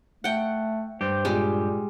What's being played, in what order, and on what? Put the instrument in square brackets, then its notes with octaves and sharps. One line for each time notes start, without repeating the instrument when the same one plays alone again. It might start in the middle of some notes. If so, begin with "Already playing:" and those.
[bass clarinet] A3 [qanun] F#5 G5
[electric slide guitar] G2 G4 [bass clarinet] C5
[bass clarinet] A#2 [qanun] G3 G#3